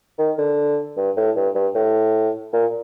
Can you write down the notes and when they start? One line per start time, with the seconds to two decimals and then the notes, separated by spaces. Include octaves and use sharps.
0.19 D#3
0.38 D3
0.97 G2
1.16 A2
1.36 G2
1.54 G2
1.75 A2
2.53 A#2